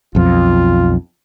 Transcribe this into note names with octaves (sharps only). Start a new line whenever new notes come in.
B1 F2 F4